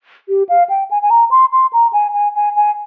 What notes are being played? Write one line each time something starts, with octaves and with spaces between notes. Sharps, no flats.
G4
F5
G5
G#5
G#5
A#5
C6
C6
A#5
G#5
G#5
G#5
G#5